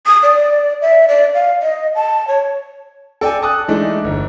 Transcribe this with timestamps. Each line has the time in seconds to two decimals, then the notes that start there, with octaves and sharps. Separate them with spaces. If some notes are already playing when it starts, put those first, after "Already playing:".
0.06 D#6
0.23 D5
0.82 E5
1.08 D5
1.34 F5
1.62 D#5
1.96 A5
2.28 C#5
3.21 A4 D5 G5 G#5
3.42 A5 D#6 F#6
3.68 E3 G#3 A3 D4 D#4
4.04 G1